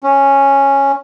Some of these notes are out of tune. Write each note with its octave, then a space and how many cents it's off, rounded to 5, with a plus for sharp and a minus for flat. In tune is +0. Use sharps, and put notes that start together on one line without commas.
C#4 -5